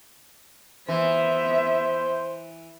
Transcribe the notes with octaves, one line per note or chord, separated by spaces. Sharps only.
E3 B3 C5 E5